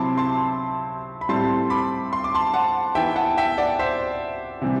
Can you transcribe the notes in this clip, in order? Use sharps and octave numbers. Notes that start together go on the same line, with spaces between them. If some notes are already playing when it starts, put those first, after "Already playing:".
Already playing: C3 F#3 C4 E4 A5 B5 C6 D6
A5 C6
B5
A2 G3 C4 A5 C6
B5 D6
C6
D6
A5 C6
F#5 A5
E3 B3 E4 E5 G5
F#5 A5
E5 G5
D5 F#5
C5 E5
C3 E3 G3